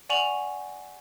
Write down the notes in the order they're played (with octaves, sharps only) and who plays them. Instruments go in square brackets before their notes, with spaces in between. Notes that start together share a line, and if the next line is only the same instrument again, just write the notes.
[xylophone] D5 F#5 G#5 C#6 F7 F#7